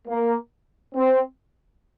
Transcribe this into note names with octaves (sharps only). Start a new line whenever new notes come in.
A#3
C4